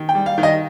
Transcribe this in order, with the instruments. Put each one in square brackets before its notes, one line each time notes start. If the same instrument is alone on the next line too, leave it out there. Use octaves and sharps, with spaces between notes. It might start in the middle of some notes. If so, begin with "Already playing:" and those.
Already playing: [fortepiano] D#3
G5
G3
F5
D#3
D#5